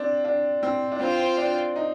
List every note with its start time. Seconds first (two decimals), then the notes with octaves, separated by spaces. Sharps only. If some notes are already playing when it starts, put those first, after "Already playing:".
Already playing: C4 D4
0.25 D4
0.63 C4
0.92 D4
1.00 C4 F4 C5 G5
1.37 D4
1.76 D#4